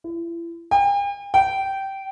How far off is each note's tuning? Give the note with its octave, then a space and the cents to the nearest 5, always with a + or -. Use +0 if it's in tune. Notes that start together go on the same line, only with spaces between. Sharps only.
E4 +35
G5 +45
G5 -15